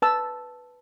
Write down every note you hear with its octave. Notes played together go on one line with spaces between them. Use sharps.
B4 A5 E6